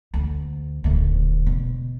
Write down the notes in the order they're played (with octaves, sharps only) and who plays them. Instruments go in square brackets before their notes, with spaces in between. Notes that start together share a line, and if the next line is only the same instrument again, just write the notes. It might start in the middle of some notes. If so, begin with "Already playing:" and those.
[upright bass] D2
D#1 D2
B2